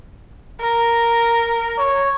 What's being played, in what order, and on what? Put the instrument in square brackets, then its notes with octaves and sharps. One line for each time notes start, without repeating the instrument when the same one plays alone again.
[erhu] A#4
[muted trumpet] C#5